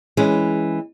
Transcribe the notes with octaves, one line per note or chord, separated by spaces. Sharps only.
E3 G#3 C#4